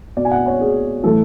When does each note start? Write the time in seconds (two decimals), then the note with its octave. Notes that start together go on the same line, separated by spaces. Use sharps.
0.17 B2 D5
0.25 G#5
0.31 F#5
0.46 C#5
0.61 G#4
1.04 A2 E3 A4